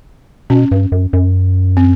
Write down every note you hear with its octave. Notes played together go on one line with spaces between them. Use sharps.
B2 C#4
G2
F#2
F#2
C4